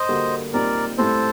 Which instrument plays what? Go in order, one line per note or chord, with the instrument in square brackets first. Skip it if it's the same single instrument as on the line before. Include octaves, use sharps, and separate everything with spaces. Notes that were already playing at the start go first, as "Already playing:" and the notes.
Already playing: [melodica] C5 D#5
[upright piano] D3 G3 A#3 F#4
[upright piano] A#2 G3 C4 D#4 [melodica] A#4 D5
[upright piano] A2 G3 C4 [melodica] A4 C5